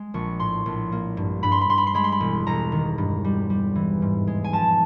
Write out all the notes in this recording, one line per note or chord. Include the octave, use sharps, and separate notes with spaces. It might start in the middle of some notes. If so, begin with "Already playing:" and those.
Already playing: G#3
A#1 C#6
A2 C6
A#1
A#3
G2
G2 B5
C6
B5
G2 C6
B5
C6
G#3 B5
C6
B5
E1
E1 A#5
D#3
G2
G3
G3
E3
G#2
G#3
G#5
F3 A5